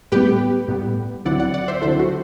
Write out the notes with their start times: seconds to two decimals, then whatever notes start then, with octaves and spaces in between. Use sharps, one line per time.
0.12 A2 G3 B3 G4 B4
0.68 A2 G3 B3
1.25 D2 D3 F#3 C4 E4 D5 F#5
1.39 D5 F#5
1.54 D5 F#5
1.68 C5 E5
1.82 D2 D3 F#3 C4 E4 A4 C5
1.99 F#4